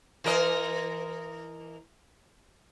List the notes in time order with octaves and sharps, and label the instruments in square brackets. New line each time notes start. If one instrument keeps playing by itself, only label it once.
[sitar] E3 A#4 D#5